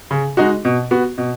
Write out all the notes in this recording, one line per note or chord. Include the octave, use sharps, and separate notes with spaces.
C#3
G#3 D#4 F#4
B2
B3 F#4
B2